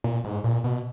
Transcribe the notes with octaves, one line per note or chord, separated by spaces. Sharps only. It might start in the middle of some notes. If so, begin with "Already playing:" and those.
A#2
G#2
A#2
B2